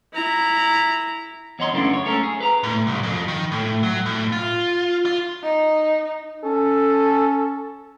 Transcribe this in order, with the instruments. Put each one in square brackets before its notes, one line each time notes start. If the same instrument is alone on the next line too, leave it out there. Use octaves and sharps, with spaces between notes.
[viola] E4 A#5
[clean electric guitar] E2 C#5 D#5 B5 C6
F#2 C#3 E3 A3 A#3 D4
F#2 C#5
A3 C#4 A4 A#4
G#4
B4 A#5
[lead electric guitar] A2
C2
F2
D#3
A2
F#3
A2
F4
F4
[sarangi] D#4
[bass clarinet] C#4 [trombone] A4